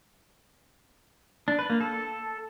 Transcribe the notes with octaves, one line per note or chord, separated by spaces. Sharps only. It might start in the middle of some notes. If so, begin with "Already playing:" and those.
D4
B4
A#3
A4